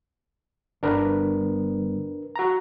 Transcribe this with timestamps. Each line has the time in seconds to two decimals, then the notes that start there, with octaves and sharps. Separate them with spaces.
0.83 G1 D4 A#4 B4
2.36 F#4 A#5